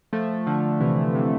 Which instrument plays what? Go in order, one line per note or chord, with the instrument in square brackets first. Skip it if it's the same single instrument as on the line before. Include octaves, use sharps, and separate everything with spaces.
[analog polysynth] F3 A3
D3 F3
C3 E3
C3